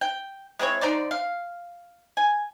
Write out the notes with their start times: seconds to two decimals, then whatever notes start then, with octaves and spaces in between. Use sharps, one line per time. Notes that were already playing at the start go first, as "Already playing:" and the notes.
0.01 G5
0.59 G#3 C4 E4 C#5
0.81 D3 D#4 C5 D5
1.11 F5
2.17 G#5